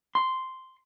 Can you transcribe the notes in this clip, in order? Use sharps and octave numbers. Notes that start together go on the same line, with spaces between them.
C6